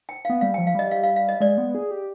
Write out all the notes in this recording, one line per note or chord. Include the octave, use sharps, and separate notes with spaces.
G5
B3 F5
G3 F5
F3 G5
F5
G3 D#5
F5
F5
F5
D#5
G#3 D5
B3
G#4
G4